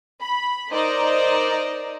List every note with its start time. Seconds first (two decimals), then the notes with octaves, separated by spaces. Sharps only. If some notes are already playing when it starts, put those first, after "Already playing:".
0.21 B5
0.71 D#4 A#4 C5 D5 D#5